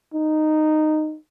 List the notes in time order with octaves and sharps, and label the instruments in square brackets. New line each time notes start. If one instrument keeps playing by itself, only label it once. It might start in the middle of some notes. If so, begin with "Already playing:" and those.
[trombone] D#4